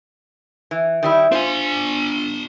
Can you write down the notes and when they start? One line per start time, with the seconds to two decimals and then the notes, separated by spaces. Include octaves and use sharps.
0.71 E3
1.03 D#3 G3 E4
1.32 D4 F4 C5 G#5